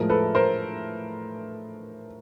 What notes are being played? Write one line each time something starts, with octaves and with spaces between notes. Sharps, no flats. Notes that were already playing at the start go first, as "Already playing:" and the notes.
Already playing: A2 F3 G#3 A#4
A4 B4
A#4 C5